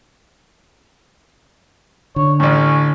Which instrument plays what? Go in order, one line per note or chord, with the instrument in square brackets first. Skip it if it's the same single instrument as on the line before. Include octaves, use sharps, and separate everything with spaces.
[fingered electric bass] D3 [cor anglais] C#5
[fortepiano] A1 A2 [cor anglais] C#4